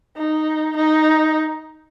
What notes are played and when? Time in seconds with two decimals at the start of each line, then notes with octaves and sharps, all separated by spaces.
0.17 D#4
0.77 D#4